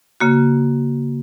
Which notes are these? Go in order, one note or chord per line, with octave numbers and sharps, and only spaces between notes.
C#3 A#3 F#4